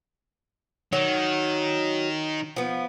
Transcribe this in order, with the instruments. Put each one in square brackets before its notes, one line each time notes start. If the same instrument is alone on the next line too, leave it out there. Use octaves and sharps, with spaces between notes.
[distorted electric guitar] D#3 [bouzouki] F#3
[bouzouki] F3 B3